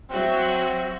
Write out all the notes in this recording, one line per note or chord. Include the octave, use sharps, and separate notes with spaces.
F#3 C4 F#4 E5